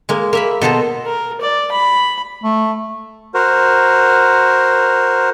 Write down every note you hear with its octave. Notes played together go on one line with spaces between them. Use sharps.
G#3 A#3
A#3 E5 B5
B2 A4 C5 D#5 A5 A#5
A#4
D5
B5
A3
F#4 A#4 C5